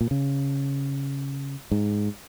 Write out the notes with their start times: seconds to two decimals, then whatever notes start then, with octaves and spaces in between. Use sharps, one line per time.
0.01 A#2
0.11 C#3
1.71 G#2